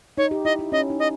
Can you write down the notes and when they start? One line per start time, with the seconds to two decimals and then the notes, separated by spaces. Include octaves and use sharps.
0.18 D#4 C#5
0.31 G4
0.45 E4 D#5
0.59 E4
0.72 C#4 D#5
0.90 D#4
1.00 D#5